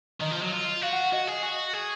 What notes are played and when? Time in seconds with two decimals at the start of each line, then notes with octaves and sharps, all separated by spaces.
0.21 D#3 D#5
0.31 F3
0.42 F#3
0.52 F4
0.81 F#4 F5
0.93 F#5
1.03 F#5
1.13 F#4 D#5
1.28 G#4
1.43 F#4
1.73 G#4